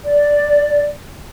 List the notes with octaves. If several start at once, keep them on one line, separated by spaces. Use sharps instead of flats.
D5